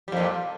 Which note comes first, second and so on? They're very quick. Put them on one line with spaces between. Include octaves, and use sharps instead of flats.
G3 F2 A#2